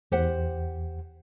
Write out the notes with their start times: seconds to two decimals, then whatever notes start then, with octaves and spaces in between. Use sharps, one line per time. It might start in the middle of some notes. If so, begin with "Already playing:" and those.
0.12 E2 G4 C5 F#5